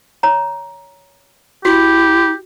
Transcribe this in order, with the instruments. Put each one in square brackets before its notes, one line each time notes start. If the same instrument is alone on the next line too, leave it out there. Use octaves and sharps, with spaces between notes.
[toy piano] C#5 A#5
[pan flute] E4 [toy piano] F#4 [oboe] G4